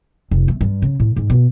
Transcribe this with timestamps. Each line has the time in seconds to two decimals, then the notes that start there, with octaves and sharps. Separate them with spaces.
0.31 F1
0.48 A3
0.61 G2
0.82 C#3
1.00 A2
1.17 G#2
1.30 B2